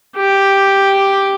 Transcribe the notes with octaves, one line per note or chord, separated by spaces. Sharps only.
G4